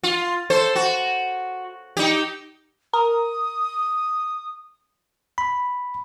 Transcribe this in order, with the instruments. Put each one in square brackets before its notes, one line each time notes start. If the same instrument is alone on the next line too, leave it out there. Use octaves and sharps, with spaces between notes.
[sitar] F4
A4 C5
F#4
D#4 G4
[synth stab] A#4 [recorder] D#6
[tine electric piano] B5